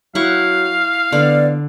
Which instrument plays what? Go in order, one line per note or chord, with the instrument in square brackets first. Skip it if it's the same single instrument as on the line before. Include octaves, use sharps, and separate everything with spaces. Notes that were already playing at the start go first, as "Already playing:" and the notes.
[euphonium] F#3 [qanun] E4 F#5 C#6 [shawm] F5
[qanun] D3 [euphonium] B3 [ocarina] D5